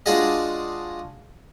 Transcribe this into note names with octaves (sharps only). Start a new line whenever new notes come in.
G#3 D4 F4 F#4 G#4 D#5